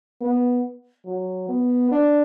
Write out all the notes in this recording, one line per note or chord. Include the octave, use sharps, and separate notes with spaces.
B3
F#3
B3
D4